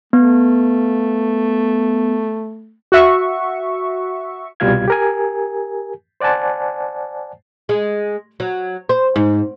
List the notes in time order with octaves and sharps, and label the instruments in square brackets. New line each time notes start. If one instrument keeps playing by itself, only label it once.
[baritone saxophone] A3 [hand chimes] B3
[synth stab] F#4 E5 C#6
[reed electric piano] C2 B2 G3 F4 F5 G#6
G4 A#4 G#5
C5 D5 F#5 G#5 A5
[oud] G#3
F#3
C5
G#2